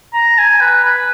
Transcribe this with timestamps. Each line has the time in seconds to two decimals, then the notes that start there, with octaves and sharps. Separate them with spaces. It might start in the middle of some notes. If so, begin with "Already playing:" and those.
0.13 A#5
0.38 G#5
0.61 B4
0.85 B4